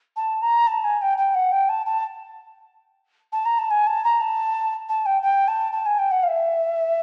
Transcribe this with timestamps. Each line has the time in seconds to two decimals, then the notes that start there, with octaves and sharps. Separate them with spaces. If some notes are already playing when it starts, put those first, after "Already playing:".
0.17 A5
0.42 A#5
0.67 A5
0.84 G#5
1.02 G5
1.17 G5
1.34 F#5
1.52 G5
1.69 A5
1.86 A5
3.33 A5
3.45 A#5
3.59 A5
3.71 G#5
3.87 A5
4.04 A#5
4.21 A5
4.89 A5
5.06 G5
5.22 G5
5.48 A5
5.72 A5
5.86 G#5
5.99 G5
6.11 F#5
6.23 F5
6.28 E5